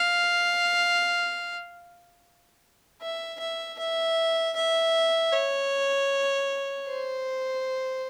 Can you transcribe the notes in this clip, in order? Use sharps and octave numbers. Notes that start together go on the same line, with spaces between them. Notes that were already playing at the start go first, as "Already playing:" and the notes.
Already playing: F5
E5
E5
E5
E5
C#5
C5